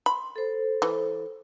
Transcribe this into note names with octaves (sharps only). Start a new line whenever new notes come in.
B5 C6
A4 C5
E3